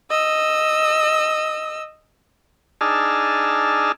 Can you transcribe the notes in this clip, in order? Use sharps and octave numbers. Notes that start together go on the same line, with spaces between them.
D#5 E6
D4 D#4 G#4 A5 E6 F6